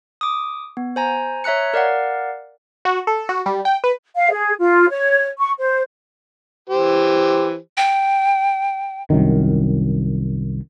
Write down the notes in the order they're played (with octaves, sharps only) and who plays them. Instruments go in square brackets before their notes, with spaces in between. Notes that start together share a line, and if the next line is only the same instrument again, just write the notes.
[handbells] D6 D#6
B3
C5 G#5 A#5
C#5 E5 A#5 F#6 C#7
A#4 D5 F5 F#5
[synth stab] F#4
A4
F#4
G3
G5
B4
[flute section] F5
G#4
F4
C#5
C#6
C5
[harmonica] E3 G4 C5
[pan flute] G5
[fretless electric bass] C2 F#2 D#3